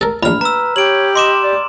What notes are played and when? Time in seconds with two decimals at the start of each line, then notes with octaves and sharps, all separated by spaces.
0.01 A4 A#4
0.23 A#1 A2 B5 F6
0.41 B4 A#5 E6
0.76 G4 C#5 D7 F#7
1.15 D#5 C6 D6 E7
1.43 D5